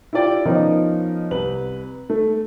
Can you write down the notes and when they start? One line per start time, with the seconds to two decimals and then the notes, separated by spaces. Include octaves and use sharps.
0.13 E4 F4 G4 D5 G5
0.45 F3 B3 C#4 D#4 A#4 C#5
1.31 C2 B4 F#7
2.10 A3